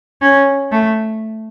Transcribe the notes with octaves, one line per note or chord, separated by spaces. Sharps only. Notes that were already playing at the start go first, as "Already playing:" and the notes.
C#4
A3